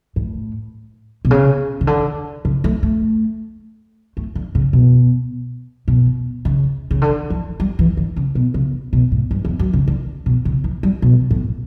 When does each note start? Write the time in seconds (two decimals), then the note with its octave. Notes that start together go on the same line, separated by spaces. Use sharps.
0.16 A2
1.25 B2
1.31 C#3
1.81 C#3
1.87 D3
2.45 C#3
2.64 A3
2.83 A3
4.17 A3
4.35 D3
4.55 C#3
4.73 B2
5.88 B2
6.45 C#3
6.91 C#3
7.02 D3
7.30 E3
7.60 G3
7.79 E3
7.97 D3
8.16 C#3
8.35 B2
8.54 C#3
8.93 B2
9.12 A2
9.31 G2
9.45 E2
9.59 F#2
9.73 C#3
9.88 D3
10.26 B2
10.45 C#3
10.64 E3
10.83 G3
11.02 B2
11.31 A2